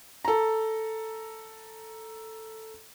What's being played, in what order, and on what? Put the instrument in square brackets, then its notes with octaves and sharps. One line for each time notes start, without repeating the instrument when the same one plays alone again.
[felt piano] A4 A#5